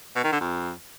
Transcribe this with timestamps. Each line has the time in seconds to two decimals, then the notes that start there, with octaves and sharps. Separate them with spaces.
0.16 B2
0.24 D#3
0.32 D3
0.40 F2